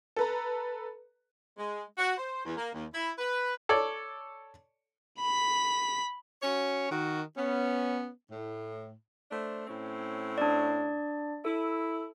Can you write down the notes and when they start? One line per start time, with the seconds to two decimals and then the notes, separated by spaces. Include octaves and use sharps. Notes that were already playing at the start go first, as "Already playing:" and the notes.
0.16 A4 B4 A#5
1.58 G#3
1.98 F#4
2.18 C5
2.45 E2
2.58 A#3
2.73 D#2
2.93 E4
3.18 B4
3.69 A4 C#5 D5
5.19 B5 B6
6.43 C#4 F#4 C#5
6.91 D#3 F#4
7.37 B3 C#4
8.31 A2
9.30 A3 D4 C5
9.66 A2 C4 C#4
10.38 D4 D5
11.45 E4 A4